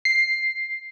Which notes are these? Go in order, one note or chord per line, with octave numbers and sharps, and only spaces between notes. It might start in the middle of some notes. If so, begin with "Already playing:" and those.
C7